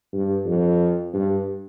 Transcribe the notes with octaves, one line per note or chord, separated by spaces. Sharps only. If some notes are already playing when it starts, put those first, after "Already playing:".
G2
F2
G2